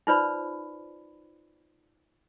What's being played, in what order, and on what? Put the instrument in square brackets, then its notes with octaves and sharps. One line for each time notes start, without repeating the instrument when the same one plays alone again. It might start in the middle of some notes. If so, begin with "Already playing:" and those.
[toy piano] D#4 F4 B4 C5 D5 B5